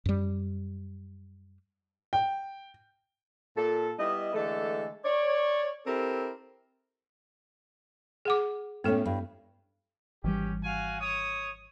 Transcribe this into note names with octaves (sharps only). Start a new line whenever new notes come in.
F#2 G3
G5
A#2 A4
G3 B3 E4 D#5
D3 E3 G#3 A3 A4
C#5 D5
C4 E4 G4 A4 A#4
G#4 F#5 D6
A2 A3 B3 C#4 A4
G2
G#1 E3 G3 C#4 G4
F#4 F5 G#5
C#5 D#6